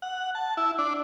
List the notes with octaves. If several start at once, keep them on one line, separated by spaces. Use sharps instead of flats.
F#5
A5
E4
D4